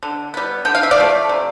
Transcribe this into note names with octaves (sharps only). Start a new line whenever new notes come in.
D3
G3 B3
D3 G5
F5
E5
D5 F5
F3 A3
C3